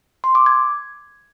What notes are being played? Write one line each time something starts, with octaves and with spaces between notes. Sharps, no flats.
C6
D6
G#6